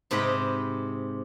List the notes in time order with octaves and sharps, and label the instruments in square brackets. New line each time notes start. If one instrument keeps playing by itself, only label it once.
[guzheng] G#2 C3 G4 D#5 G5 B5